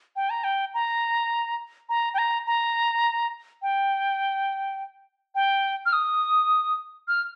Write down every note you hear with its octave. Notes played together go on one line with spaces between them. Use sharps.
G5
A#5
G5
A#5
A#5
G5
A#5
A#5
G5
G5
F6
D#6
F6